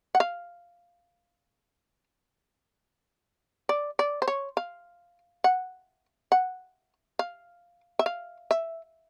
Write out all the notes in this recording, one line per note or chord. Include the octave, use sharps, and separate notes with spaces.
F#5
F5
D5
D5
C5
C#5
F5
F#5
F#5
F5
E5
F5
E5